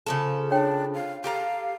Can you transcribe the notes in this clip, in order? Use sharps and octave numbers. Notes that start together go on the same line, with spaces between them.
C#3 F3 A4
D4 C#5 G5
F5
G4 A4 F5 A#5